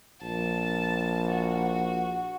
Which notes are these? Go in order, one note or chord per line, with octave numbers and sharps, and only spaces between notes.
A#1 A5
F#4